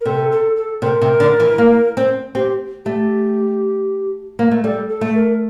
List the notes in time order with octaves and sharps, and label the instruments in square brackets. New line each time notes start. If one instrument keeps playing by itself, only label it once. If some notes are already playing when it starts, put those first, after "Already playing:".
[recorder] A#4
[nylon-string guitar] C3 [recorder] A4
[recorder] A4
A4
[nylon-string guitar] C3 [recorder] A#4
[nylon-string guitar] C3
D3
E3
A#3
C4
[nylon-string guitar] C4 [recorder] G4
[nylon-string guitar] A3 [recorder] G4
[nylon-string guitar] A#3
A3
[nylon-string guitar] G3 [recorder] A4
[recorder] A4
[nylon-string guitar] A3
[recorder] A#4